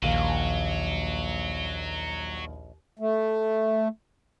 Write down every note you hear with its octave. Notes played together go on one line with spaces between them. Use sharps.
A#1 D#2 F#3 F5 D#7
A3